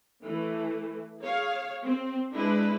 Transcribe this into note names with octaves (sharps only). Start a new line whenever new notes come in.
E3 A3
G#4 C#5 F5
C4
G#3 D4 E4 B4